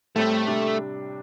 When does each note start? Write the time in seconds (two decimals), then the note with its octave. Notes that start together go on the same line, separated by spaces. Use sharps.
0.16 A2 G3 A3 C4
0.47 C3 G3 D4